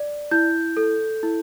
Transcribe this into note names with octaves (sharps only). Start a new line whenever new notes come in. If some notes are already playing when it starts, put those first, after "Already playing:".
Already playing: D5
E4 G6
A4
E4